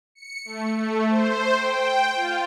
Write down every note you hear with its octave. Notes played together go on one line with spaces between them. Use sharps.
C#7
A3
A3
C5
G5
F4